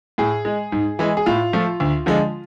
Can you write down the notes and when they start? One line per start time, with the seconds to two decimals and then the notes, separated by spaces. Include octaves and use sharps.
0.18 A2 G#4
0.45 G#3
0.72 G#2
0.99 E3 G#3
1.17 G#4
1.26 A2 F4
1.53 F3 A3
1.80 D2
2.06 D3 F3 G#3